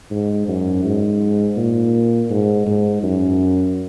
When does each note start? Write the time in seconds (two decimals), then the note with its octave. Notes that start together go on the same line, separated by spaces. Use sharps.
0.11 G#2
0.48 F#2
0.84 G#2
1.57 A#2
2.30 G#2
2.66 G#2
3.03 F#2